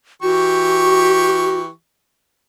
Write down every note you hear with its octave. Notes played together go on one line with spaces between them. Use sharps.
E3 F#4 G4 C#6